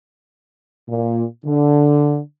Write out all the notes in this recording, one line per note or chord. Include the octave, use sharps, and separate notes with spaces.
A#2
D3